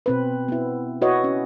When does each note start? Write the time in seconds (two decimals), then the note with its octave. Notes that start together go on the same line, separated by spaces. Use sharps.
0.06 B2 C4 B4
0.48 B3 E4
1.01 E4 F#4 B4 C#5 D#5
1.24 C#4